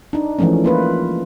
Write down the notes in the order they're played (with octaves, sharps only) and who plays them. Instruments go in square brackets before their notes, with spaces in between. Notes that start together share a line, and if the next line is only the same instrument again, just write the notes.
[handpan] D4 D#4
E3 F3 G#3 A3 C#4
A#3 F4 B4